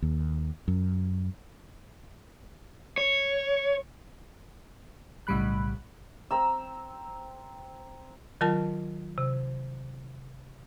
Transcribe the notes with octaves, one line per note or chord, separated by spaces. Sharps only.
D#2
F#2
C#5
B1 A2 C#3 G3 B5 F#6
C4 A#5 E6
D#3 F#3 F4 A#4 A5
C3